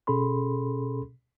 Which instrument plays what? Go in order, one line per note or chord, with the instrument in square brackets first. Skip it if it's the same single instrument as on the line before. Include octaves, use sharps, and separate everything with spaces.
[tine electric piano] B2 C#4 G#4 A4 B5 C6